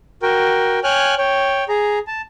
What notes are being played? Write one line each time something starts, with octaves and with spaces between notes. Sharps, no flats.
F#4 A#4 G5
C#5 G5 G#5 F6 F#6
C#5 G5
G#4 A#5
A5